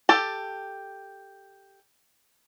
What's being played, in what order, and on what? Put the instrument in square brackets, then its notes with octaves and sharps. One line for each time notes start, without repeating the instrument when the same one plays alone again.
[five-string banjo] G4 A4 A5